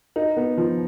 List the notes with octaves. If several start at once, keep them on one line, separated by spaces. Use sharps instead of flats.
D#4
B3
F3